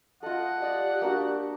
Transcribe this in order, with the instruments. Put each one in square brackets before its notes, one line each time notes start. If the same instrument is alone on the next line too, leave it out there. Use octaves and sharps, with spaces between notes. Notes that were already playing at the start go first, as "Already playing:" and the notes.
[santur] F4 A4 [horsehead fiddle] D#5 [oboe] F#5
[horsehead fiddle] G4 [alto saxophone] D5 [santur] D#5
[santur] A#3 D4 F#4